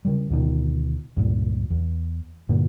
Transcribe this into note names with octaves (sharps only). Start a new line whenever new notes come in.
C#3 G3
D2 B2 D#3
C#2 G2 A#2
E2
G2 A#2 D3 A#3